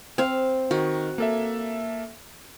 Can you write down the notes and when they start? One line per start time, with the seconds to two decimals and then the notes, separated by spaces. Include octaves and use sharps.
0.18 C4 F5
0.71 D#3 F#4
1.18 A#3 A4 E5